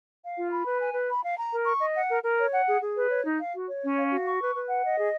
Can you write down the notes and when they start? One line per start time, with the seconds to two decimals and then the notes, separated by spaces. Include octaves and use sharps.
0.22 F5
0.36 F4
0.51 B5
0.65 B4
0.80 G#5
0.93 B4
1.08 B5
1.23 F5
1.37 A#5
1.51 A#4
1.65 C#6
1.80 D#5
1.95 F#5
2.09 A#4
2.23 A#4
2.38 C#5
2.52 F#5
2.67 G#4
2.81 G#4
2.96 B4
3.10 C#5
3.24 D#4
3.39 F5
3.54 F#4
3.68 C#5
3.83 C#4
3.97 F5
4.11 F#4
4.25 C#6
4.40 B4
4.54 B4
4.68 F#5
4.83 D#5
4.98 G#4